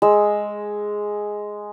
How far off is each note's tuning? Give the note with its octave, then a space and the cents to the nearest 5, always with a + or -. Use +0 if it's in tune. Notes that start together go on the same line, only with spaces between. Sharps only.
G#3 +0 E6 +0